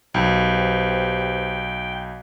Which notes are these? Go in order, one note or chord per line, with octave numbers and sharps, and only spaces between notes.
B1 G4 B4 C5 G5